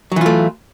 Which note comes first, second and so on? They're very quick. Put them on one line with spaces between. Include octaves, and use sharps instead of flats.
F#3 E3 F4 A3